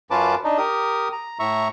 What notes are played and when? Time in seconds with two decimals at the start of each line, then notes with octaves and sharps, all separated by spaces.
0.11 F#2 C#4 F4 B4 A5 D6
0.44 D4 D#4
0.58 G4 A#4 D#6
1.13 A#5
1.39 A2 E5 A#5 C#6